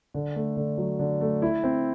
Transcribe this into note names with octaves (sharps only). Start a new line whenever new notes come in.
D3
A3
D3
F#3
D3
A3
E4
C4